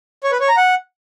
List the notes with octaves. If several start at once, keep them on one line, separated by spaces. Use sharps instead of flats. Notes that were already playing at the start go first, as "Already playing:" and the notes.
C#5
B4
C#5
A#5
F#5